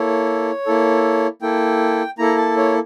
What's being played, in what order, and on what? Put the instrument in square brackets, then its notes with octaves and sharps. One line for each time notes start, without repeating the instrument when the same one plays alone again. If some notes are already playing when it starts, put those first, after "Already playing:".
Already playing: [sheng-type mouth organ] A#3 E4 A4 C#5
A#3 E4 A4
A#3 E4 A4 G5
A#3 E4 A4 A#5
A5
C#5